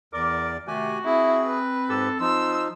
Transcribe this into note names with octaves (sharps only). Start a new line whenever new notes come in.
E2 A#4 D5 D6
C3 D#3 A3 F#4 G4 G#5
C4 E4 G#4
B4
G#2 G4 A4 E6
F3 D#4 C6 E6